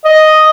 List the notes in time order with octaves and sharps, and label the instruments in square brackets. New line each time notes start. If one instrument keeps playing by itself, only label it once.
[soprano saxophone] D#5